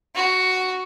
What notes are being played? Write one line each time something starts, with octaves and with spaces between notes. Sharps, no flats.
F#4